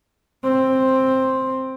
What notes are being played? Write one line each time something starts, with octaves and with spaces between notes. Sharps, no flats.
C4